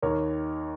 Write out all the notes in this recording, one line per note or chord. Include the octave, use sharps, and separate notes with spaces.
D#2 D#3 A#4 C#5